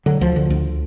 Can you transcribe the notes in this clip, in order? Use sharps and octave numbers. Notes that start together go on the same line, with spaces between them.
D3 F#3
D2 F3
D3
D2